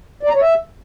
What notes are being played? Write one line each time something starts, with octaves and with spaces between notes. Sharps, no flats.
D5
A#5
C#5
E5